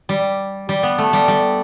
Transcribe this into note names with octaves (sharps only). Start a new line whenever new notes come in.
G3
G3
B3
A3
G3
G3